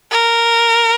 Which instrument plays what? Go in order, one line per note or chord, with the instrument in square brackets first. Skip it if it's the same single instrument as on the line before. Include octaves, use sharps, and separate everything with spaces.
[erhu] A#4